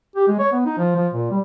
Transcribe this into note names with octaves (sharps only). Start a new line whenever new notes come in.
G4
G#3
C#5
B3
D#4
F3
F3
A#2
G3